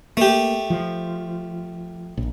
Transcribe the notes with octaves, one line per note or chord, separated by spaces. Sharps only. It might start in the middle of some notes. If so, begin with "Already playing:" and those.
A3 A#3 G4
F3
A#1